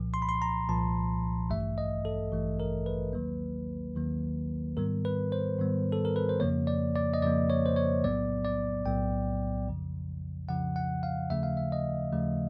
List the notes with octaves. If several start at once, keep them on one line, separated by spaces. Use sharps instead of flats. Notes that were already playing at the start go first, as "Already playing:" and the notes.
Already playing: C2 A#2 F3
C6
B5
C6
A#5
C2 A#2 F3 A5
A1 G2 E3 A3 E5
D#5
A4
A1 G2 E3 A3
A#4
B4
D#2 D#3 F#3 A#3
D#2 D#3 F#3 A#3
G#2 D#3 G3 B3 A#4
B4
C5
G#2 D#3 G3 B3
A4
A#4
B4
C5
F2 C#3 F3 A#3 C#5
D5
D5
D#5
F2 C#3 F3 A#3 D5
C#5
C5
C#5
B1 A2 F#3 B3 D5
D5
B1 A2 F#3 B3 G5
F2 C#3 F3
F2 C#3 F3 F#5
F#5
F5
D#2 C#3 F3 A3 E5
F5
E5
D#5
D#2 C#3 F3 A3